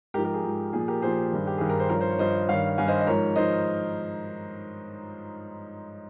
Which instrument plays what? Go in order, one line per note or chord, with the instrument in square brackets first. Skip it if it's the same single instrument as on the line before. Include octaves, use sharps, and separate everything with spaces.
[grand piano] G#2 G4 A#4
F3
G4 A#4
G#4
G#2 F3
A#2 F3 G#4
G4 A#4
A#2 F3 G#4 C5
G2 D#3
G4
G2 D#3 G#4
A#4
C5
G2 F3 A#4 C#5
C5
C#5
G2 F3 C5 D#5
G2 D#3 C#5 F5
G2 D#3 F5 G#5
C5 D#5
D#5
G#2 F3 A#4 C#5
G#2 F3 C5 D#5